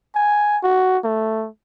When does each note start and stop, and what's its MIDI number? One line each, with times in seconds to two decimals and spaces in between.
0.15 0.58 80
0.63 0.98 66
1.04 1.48 57